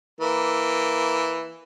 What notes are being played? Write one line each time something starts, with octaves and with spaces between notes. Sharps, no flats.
E3 A#3